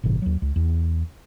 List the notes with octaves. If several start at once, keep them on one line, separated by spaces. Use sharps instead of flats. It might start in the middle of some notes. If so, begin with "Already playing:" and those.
G1 A2 C3 E3
D#2 F#3
C#2
E2